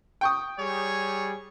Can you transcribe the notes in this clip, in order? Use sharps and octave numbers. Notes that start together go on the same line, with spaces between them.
G5 C#6 D#6
G3 G#4 C#5